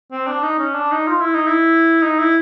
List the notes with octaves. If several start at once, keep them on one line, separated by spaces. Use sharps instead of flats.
C4
D4
D#4
C#4
D4
D#4
F4
E4
D#4
E4
D#4
E4